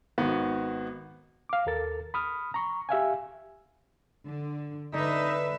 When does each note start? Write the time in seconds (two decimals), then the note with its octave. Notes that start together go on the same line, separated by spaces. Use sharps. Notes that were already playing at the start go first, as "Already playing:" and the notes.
0.18 G#1 D#3 B3 F#4
1.49 F5 D6
1.66 D#2 A4 A#4 A6
2.14 B5 D#6 F6
2.54 A#5 C#6
2.89 G4 E5 F5 G#5
4.24 D3
4.93 D3 D#4 B4 E5